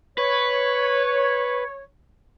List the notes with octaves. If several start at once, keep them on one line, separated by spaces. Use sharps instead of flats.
B4 C#5